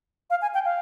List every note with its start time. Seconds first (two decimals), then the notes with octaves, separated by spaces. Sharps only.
0.30 F5
0.42 G#5
0.54 G5
0.65 F5